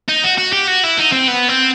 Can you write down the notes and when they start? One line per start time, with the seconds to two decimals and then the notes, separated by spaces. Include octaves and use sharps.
0.09 D#4
0.24 F#4
0.38 F#4
0.53 G4
0.68 F#4
0.84 E4
0.99 D#4
1.12 C4
1.28 B3
1.48 C4